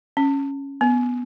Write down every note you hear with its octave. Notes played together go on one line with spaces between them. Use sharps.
C#4
B3